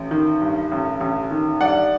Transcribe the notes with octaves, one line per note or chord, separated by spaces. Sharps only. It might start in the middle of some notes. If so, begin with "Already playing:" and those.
Already playing: A1
D#3
G2
A1
A1
D#3
G2 D5 F#5